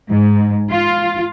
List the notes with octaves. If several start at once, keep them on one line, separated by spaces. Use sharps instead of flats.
G#2
F4